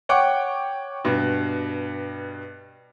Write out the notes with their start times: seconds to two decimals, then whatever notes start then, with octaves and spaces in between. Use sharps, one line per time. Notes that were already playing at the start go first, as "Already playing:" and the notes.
0.09 C#5 F#5 G5 C#6 D6
1.04 G2 B2